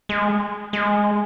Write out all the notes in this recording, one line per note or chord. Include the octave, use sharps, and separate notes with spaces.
G#3
G#3